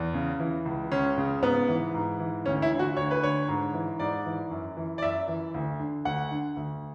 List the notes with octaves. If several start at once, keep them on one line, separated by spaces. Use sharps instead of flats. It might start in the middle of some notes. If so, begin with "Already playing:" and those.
Already playing: E2
C#3
E3
C#2
C#2 C#4
C#3
G#2 B3
E3
G#2
E3
D2 C#4
E4
D3
F#4
D2 C#5
B4
D3 C#5
G#2
E3
G#2 D5
E3
F#2
E3
D5
F#2 E5
E3
D2
D3
D2 F#5
D3
D2